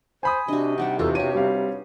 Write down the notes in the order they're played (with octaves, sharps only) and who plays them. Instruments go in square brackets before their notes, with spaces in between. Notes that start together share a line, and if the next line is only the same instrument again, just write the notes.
[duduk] C5 [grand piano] G#5 B5 D#6
[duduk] C3 [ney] D4 [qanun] F#4 D#5
[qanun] G3 D4 D#4 [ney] F#5
[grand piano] E2 [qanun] B3 F4 F#4 [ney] A4
[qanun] F#4 G4 [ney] C#5 [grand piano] D#7
[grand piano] G3 C4 F5